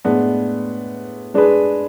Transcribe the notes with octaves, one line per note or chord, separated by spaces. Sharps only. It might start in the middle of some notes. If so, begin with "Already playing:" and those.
A2 G#3 B3 D4
G#3 D4 G#4 B4